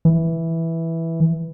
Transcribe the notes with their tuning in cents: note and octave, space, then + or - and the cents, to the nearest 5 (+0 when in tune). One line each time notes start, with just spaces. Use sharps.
E3 -5